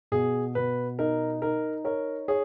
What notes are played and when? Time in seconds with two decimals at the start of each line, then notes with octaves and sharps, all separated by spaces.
0.12 B2 G#4
0.55 B2 B4
0.99 D#4 A#4
1.42 D#4 A#4
1.84 A#4 C#5
2.28 G#4 C#5